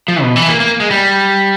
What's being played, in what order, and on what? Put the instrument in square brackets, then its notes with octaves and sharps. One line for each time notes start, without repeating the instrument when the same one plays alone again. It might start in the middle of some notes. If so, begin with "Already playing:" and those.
[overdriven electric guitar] F3
B2
E3
A#3
A#3
G#3
G3